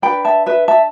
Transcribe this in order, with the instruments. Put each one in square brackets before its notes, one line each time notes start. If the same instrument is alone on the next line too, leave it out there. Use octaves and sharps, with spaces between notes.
[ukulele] D4 B4 G5 B5
E5 A5
B4 E5
E5 A5